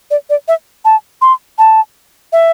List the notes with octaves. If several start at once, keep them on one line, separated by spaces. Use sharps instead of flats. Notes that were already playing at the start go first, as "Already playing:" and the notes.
D5
D5
E5
A5
C6
A5
E5